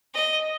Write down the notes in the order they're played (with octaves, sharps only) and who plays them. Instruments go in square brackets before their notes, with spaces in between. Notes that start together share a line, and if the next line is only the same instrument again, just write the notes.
[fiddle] D#5